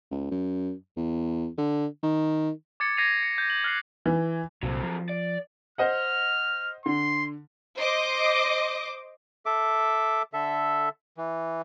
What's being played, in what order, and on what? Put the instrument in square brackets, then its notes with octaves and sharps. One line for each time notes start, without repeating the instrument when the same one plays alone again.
[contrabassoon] C#2
F#2
E2
D3
D#3
[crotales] D6 G#6 A6 C#7
G#6 A#6 C7 D#7 F7
C#7
G6 A#6
F#7
F6 F#6 G#6 C7
[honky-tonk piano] E3
[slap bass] C2 A#2 [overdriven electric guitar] F#3 C4
[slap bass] F3
[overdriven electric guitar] D5
[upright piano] C5 D#5 F#5 [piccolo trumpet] F6
[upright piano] D3 [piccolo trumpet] C6
[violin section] C5 D#5 D6
[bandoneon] A4 E5 D6
D3 A4 E5
E3